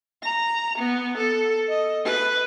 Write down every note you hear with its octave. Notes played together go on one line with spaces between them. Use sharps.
A#5
B3
A4
D#5
B4